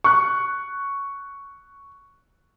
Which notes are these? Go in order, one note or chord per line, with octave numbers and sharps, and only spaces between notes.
C#6 F#6